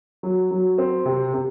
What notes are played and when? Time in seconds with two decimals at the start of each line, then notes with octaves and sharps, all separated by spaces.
0.23 F#3
0.51 F#3
0.78 C4
1.05 C3
1.34 C3